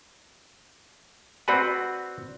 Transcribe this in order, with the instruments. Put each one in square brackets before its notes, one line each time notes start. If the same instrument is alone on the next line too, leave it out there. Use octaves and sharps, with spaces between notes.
[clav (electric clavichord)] C4 F#4 B4 [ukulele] D5 F#5 B5